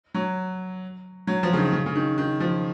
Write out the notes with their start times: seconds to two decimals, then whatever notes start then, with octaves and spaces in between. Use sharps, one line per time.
0.15 F#3
1.27 F#3
1.43 F3
1.53 C#3
1.57 D#3
1.73 C#3
1.86 C#3
1.95 D#3
2.18 D#3
2.40 F3